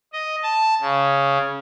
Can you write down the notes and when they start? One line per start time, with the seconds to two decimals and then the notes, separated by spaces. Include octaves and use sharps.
0.13 D#5
0.43 A5
0.81 C#3